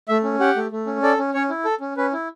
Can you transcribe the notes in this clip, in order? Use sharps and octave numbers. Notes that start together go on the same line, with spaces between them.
A3 E5
C#4
G4 F#5
A3
A3
C#4
A4 D5
C#4
C#4 C#5
E4
A4
C#4
C#4 B4
E4